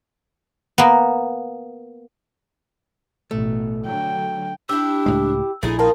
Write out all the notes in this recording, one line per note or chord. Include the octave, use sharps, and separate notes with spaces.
A#3 B3
A1 B2 A3
D3 F#3 G5
D4 E4 G4 E6
C#2 A2 G#3
A#1 A#2 A3 D#4 E4 G#4
C4 D#4 F4 A#4 A5